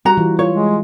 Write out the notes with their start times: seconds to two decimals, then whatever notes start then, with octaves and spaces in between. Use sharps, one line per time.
0.05 G3 F#4 A#5
0.17 E3 F4
0.39 F4 C#5
0.52 G#3